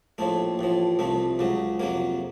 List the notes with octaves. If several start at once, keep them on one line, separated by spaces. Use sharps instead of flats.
A#1 A2 F3 A3
A1 A2 F3
C2 C3 F3 A3
C#2 C#3 F#3
F2 C3 F#3 A#3